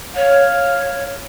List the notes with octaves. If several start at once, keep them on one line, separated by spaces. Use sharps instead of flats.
C#5 F5